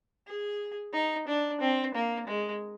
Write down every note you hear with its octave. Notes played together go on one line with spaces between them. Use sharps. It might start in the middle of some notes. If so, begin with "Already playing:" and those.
G#4
D#4
D4
C4
A#3
G#3